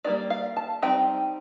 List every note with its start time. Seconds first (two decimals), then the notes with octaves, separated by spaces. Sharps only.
0.05 G3 A#3 D#4 D5
0.30 F5
0.57 A5
0.82 G3 C4 D#4 G5